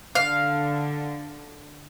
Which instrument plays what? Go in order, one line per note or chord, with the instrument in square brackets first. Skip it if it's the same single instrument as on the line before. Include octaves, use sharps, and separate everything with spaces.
[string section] D3 [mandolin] F5